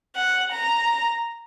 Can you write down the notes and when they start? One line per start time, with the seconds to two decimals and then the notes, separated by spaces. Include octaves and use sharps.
0.16 F#5
0.53 A#5